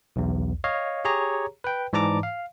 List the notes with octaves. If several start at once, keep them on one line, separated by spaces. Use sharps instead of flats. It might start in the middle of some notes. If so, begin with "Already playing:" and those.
B1 E2
C#5 D#5 F5
G4 G#4 C#5 A#5
B4 G5
G#2 E3 D5 A5 A#5 D6
F5